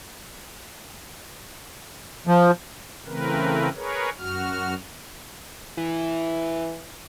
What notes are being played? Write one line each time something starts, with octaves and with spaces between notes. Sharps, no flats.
F3
C#3 E3 A3 C4 A#4 B4
G#4 A#4 B4 C#5
F#2 F#4 F6
E3